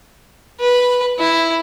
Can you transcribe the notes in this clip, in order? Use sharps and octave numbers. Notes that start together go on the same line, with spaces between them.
B4
E4